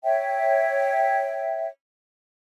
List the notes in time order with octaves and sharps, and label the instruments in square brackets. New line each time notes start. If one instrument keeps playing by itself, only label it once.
[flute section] C#5 E5 G5